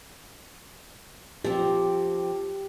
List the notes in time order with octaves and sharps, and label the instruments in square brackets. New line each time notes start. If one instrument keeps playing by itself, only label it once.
[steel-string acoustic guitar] F3 C4 [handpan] G4